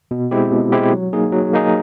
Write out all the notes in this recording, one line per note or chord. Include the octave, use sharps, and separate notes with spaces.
B2
G#3 C4 E4 G4
B2
G#3 C4 E4 G4
F#3
A#3 D#4 G#4
F#3
A#3 D#4 G#4